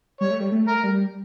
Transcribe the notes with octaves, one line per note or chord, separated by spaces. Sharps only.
G3 C#5
A3
G3
A3
A#4
G3